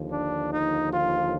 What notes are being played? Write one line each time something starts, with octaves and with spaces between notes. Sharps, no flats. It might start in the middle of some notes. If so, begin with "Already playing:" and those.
Already playing: D#2 D3 F3
D4
D#4
F4